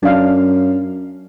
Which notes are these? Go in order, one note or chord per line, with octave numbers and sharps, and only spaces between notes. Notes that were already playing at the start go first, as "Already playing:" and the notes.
F#2 D4 F5